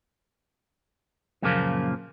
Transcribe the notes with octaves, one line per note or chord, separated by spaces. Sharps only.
F#2 A#2 C#3 F3 A#3